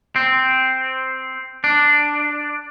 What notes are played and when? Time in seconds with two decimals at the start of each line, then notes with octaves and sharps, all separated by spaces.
0.16 C4
1.64 D4